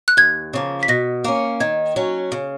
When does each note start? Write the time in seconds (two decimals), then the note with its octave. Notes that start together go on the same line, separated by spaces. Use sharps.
0.08 F#6
0.17 D#2 G#6
0.53 C#3 F3 A#3
0.83 B6
0.88 B2 A#6
1.24 A#3 C#4
1.60 D#3 G#6
1.96 F#3 C#4
2.32 C#3